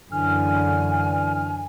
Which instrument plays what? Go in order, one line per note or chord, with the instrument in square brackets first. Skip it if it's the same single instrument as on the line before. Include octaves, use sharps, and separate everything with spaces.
[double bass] F#2 [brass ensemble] D3 E3 [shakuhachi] G#5 [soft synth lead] F6